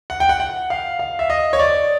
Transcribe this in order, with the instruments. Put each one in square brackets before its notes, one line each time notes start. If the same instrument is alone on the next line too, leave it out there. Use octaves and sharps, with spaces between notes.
[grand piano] F#5
G5
F#5
F#5
F5
F5
E5
D#5
C#5
D5